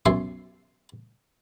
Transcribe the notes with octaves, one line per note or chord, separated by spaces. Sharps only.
B1 F#2 C#5 E5 C6 C#6